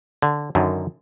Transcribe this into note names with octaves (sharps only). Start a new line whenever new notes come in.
D3
F#2 D3 D#3